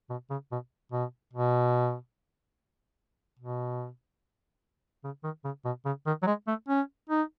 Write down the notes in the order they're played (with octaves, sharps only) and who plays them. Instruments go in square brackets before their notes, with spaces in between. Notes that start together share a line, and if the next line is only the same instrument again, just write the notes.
[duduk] B2
C#3
B2
B2
B2
B2
C#3
D#3
C#3
B2
C#3
D#3
F#3
G#3
A3
C#4
D#4